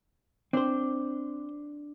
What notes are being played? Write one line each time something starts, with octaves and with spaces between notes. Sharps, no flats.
C4 D4 C5